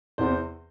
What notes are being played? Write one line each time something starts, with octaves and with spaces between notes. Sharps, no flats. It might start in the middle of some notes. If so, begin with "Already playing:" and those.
E2 C3 E3 C5